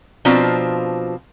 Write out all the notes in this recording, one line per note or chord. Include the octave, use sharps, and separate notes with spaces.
B2 F3 C4 D4 F4 A#5